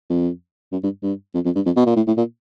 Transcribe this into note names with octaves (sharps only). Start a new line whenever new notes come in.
F2
F#2
G2
G2
F2
F2
G2
F2
B2
A#2
A2
A2
A#2